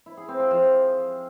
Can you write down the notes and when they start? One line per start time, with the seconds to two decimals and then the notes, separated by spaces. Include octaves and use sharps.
0.06 E4
0.17 G#4
0.28 C4
0.40 F4
0.51 F3